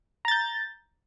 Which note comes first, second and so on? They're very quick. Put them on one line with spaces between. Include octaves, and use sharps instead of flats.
A#5 A6 G6